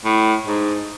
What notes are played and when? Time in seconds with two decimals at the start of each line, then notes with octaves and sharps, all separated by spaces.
0.05 A2
0.46 G#2